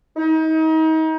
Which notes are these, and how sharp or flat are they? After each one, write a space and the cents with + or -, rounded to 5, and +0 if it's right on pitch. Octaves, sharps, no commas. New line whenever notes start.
D#4 +35